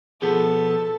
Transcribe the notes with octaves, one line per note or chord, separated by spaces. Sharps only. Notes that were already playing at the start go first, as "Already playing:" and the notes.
B2 F3 B3 G#4 A4